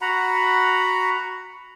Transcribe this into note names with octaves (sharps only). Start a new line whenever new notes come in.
F#4 F#5 A#5 B5